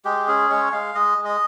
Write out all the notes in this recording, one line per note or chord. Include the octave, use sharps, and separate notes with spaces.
G#3 G4
C#4 G#4
G#3 C#5
G#3 F5
G#3 D#5
G#3
D#5